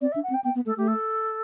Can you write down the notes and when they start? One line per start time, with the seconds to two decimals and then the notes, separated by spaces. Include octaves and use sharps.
0.01 C4 D5
0.12 E5
0.16 D4
0.23 F#5
0.30 C4
0.34 G5
0.44 B3 G5
0.55 B3
0.66 A3 A4
0.77 A3 G4
0.88 A4